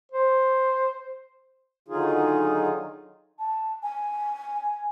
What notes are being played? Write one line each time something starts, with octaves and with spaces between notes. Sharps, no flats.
C5
D3 D#3 F#3 D#4 F4 G#4
A5
G#5